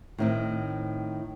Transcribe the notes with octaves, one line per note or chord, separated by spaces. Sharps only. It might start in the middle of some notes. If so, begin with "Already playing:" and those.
A2 D#3 C4